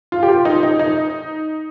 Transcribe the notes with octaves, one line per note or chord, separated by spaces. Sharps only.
F4
G4
F4
D#4
D#4
D#4